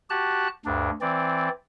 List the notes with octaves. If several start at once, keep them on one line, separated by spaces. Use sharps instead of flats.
F#4 G4 A5 F#6
D2 G2 D4
E3 C4 D5